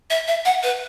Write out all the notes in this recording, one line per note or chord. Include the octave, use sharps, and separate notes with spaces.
E5
E5
F#5
B4